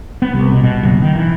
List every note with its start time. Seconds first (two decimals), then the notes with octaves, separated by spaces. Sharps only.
0.22 B3
0.33 C2
0.52 B2
0.64 B2
0.83 F#1
1.02 D#3
1.16 E3